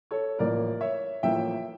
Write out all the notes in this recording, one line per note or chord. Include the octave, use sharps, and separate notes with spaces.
A4 C#5
A1 A2 F3 A#3 A#4 D5
C#5 E5
A1 A2 F3 A#3 E5 G5